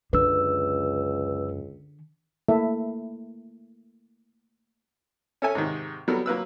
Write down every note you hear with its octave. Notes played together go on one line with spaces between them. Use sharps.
C#2 F#2 D3 B4 E6
A3 A#3 E4 A4 E5
C#4 A4 E5 G#5
G#2 C3 D#3
F#3 G3 B3 A4 A#4
F#3 A#3 B4 E6